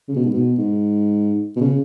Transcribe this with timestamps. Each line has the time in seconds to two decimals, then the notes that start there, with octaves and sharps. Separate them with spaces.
0.08 C#3
0.16 B2
0.25 G#2
0.34 B2
0.58 G#2
1.56 B2
1.61 C#3